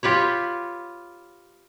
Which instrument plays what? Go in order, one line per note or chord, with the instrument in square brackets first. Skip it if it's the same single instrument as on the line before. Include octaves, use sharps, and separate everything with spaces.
[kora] F4 G4 B4 C#5